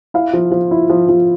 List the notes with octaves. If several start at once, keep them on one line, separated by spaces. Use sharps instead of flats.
E4 F5
F3
F3
E4
F3
F3